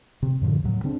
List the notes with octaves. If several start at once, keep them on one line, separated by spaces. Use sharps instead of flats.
C3
F#2 A2 D3 F3
D#2 A2 C#3 F#3
C#3 C4 D4